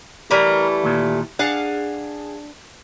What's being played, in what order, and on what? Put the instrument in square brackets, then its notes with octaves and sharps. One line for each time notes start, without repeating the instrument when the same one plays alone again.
[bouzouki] E3 G3 A3 [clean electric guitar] A#4
[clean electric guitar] D#2 A#2
[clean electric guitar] D4 [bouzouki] G#4 F5 F#5